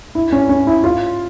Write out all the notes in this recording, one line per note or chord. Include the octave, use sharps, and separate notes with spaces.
E4
C#4
C#4
E4
F4